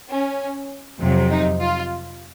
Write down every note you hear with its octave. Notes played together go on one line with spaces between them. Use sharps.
C#4
F2 C3 F#3
D#4
F4